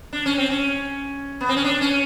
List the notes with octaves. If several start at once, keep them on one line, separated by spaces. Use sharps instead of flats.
D4
C#4
C4
C#4
B3
C4
C#4
D4
C#4